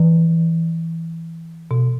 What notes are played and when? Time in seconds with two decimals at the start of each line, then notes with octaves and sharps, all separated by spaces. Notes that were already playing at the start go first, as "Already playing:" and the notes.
Already playing: E3
1.71 B2